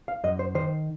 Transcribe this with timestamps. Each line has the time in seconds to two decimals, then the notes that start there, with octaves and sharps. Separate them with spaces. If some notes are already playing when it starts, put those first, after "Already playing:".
0.08 F5
0.24 F#2 D#5
0.39 C5
0.55 D#3 C5